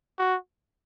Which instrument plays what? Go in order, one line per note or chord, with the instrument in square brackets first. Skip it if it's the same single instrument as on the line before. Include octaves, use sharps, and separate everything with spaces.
[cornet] F#4